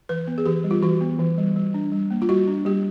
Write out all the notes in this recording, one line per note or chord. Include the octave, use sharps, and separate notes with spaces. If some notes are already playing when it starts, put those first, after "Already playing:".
E3 B4
B3
G#4
E3 G4
G3
F4
E3 F#4
B3
E3
G3
G3
D4
G3
A#3
F4
G3 F#4
D4
G3 G4